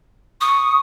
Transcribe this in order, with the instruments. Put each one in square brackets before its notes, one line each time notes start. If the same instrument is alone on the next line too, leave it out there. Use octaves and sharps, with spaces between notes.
[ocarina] C#6 [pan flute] D#6